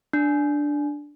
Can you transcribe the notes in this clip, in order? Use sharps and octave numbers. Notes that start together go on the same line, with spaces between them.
D4